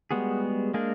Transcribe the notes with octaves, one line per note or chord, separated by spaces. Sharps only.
G3 G#3 B3 F#4 G#4
G#3 A#3 D4 G#4 A#4